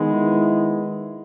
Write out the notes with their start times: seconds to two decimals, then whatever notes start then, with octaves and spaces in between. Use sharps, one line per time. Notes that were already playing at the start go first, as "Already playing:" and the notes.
Already playing: D#3 G#3 B3
0.11 E4